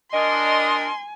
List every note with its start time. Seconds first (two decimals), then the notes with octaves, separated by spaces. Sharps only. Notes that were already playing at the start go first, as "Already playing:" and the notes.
0.13 D4 A#4 D#5 G#5 C6